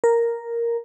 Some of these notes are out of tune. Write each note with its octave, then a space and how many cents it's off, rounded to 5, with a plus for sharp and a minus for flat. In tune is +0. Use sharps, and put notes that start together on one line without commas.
A#4 +0